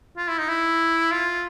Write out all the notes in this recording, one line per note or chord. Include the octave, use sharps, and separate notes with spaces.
F4
E4
D#4
E4
F4